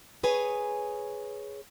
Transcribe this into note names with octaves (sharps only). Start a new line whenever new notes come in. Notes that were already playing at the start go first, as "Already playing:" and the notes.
G#4 B4 C#5 G#5